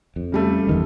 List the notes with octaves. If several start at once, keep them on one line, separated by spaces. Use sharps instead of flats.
F2
C#3 G3 A3
E2 D#3 G#3